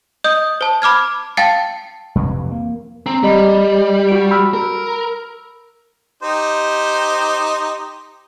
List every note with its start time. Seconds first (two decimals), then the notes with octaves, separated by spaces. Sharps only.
0.24 D#5 D#6 G6
0.61 C5 A5
0.82 B5 D6 F6 G#6
1.37 F5 G5 A5 A6 C7 C#7
2.15 F2 C3 E3
2.51 A#3
3.06 C4 A#5
3.23 G3 G4 D#5 B5
4.09 F#4 D7
4.31 B5 E6 F6
4.54 A#4
6.23 D#4 G4 C5